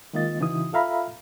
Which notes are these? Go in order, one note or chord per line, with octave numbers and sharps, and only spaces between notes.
D#3 G#3 A#3 F4 D#5 A6
C#3 E3 D#4 E4 F#4 D#6
F4 A4 E5 F5 A#5 B5